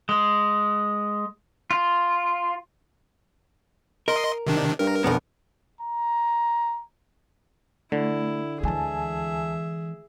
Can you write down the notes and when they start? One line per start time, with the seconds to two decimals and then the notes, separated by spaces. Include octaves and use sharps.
0.09 G#3
1.71 F4
4.08 A#4 D#5 C6
4.47 C3 D#3 D4
4.79 G2 A#4
5.04 B1 F2 D3 B3
5.81 A#5
7.92 D3 A3 E4
8.63 D2 E3 G#3 G#4 E5 G#5 A5